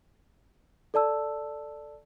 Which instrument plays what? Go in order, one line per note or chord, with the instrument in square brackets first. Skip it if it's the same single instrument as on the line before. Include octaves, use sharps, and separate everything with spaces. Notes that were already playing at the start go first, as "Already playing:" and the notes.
[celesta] A4 D5 A5 E6